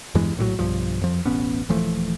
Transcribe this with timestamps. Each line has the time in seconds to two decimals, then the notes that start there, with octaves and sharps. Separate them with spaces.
0.15 E2 G2 E3 G#3
0.37 A#1 A2 D#3 F#3
0.59 B1 G2 F3
1.01 F2 F3
1.25 E1 A1 B3 C#4
1.69 D#1 E3 F3 A3